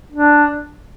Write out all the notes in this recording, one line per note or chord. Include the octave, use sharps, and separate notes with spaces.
D4